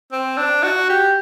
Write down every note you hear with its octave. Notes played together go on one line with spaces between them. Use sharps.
C4
D4
F#4
G4